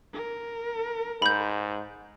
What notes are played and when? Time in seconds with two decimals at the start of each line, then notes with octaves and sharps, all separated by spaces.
0.14 A#4
1.22 G#2 B5 G6